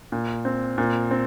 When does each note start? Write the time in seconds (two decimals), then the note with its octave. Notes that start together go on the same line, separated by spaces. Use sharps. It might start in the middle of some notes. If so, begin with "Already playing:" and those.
0.12 A#2
0.45 C4
0.78 A#2
1.11 C4